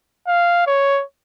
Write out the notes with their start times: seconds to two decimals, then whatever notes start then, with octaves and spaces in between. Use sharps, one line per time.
0.27 F5
0.67 C#5